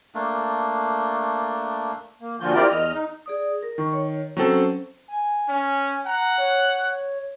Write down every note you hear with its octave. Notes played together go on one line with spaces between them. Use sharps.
A3 A#3 D4
A#3
A#2 D3 F3 F4 F#4 G6
C4 E4 F4 G4 A#4 D5
E2 D#5 F6
D#4
G#4 D5 D#6
A#4
D#3 C#6
C#5
F#3 C4 C#4 A4 C5
G#5
C#4
F#5 A#5
C#5